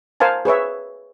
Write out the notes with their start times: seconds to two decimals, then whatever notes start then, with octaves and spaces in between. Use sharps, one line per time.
0.20 A#4 C5 F5 G#5 A5
0.45 G#4 B4 C#5 E5